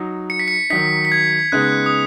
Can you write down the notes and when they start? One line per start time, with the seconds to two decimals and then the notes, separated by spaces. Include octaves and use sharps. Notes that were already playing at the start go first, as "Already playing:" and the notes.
Already playing: F#3 D#4
0.30 C#7
0.39 B6
0.48 C#7
0.70 D#3 F#3 D#4 B6
1.05 B6
1.12 G#6
1.52 C#3 G#3 B3 D#4 F#6
1.86 D#6